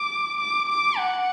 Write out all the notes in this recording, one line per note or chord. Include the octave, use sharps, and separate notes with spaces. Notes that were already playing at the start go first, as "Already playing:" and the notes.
Already playing: D6
D6
D6
F#5